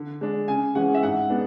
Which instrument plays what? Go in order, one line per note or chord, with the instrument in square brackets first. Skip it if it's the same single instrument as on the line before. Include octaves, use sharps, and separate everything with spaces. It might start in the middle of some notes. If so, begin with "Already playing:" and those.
Already playing: [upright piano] D3
G#3 D4
C#3 G#5
E3 G#3 C#4 F#5
E5
G#2 F#5
G#3 B3 D4